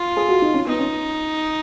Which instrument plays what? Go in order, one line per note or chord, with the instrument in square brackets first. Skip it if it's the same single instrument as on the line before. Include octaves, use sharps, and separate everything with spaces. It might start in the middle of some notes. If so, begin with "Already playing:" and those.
Already playing: [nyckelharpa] F4
[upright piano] G#4
F#4
D#4
C#4
[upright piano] B3 [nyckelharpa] D#4
[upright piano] C#4